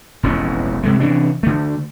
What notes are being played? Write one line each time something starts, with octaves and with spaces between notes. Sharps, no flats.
E1 A1 F2 C#4
C3 G#3 A3
C3 E3 C#4 D4
D3 A3